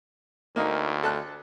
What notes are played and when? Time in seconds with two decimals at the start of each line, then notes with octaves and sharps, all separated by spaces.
0.56 D2 A#3 D#4
1.03 A4 A5 F#6